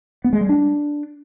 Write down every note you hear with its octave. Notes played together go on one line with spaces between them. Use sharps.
B3
G#3
G3
D4